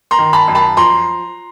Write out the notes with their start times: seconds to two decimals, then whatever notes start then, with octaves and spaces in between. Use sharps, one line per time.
0.11 A#5 C6
0.19 D#3
0.33 A5 B5
0.48 F#2
0.55 A5 B5
0.77 F3 A#5 C6